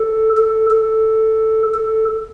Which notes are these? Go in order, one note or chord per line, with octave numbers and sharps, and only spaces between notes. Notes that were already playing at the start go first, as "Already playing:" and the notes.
Already playing: A4
A4
A4
A4